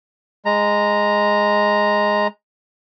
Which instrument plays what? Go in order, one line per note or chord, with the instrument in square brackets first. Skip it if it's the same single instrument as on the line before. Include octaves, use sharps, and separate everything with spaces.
[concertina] G#3 A#5